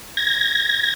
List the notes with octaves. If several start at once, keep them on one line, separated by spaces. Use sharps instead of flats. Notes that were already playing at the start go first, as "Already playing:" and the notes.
G#6 A#6